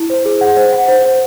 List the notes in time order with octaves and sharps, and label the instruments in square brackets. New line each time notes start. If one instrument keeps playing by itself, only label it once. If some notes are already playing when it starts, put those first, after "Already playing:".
Already playing: [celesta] E4
C5
G#4
F#5
C5
F#5
C5
C5